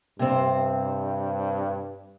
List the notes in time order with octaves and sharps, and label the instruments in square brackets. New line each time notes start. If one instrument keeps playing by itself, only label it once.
[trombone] G2 [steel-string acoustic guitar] C3 C4